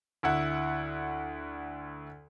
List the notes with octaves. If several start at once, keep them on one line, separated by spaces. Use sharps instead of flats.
D2 E4 F#5